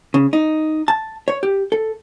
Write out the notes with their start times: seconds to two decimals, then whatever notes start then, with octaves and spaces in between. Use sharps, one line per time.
0.14 C#3
0.33 D#4
0.88 A5
1.28 C#5
1.43 G4
1.72 A4